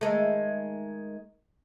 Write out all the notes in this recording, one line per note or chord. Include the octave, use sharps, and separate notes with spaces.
D#3 G#3 A3